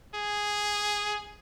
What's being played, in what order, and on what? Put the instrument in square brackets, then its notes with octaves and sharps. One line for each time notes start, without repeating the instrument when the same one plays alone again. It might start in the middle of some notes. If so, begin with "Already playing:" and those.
[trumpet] G#4